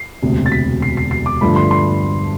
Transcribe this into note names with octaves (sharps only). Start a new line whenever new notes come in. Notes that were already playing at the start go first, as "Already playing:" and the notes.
Already playing: C7
E1 D2 C3
A6
B6
C7
C7
C7
D6
G2 D3 F3 A3 B5
C6
C6